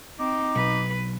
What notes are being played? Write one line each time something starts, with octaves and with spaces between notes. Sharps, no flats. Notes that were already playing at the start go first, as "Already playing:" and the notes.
C4 D#4 D6
B1 B4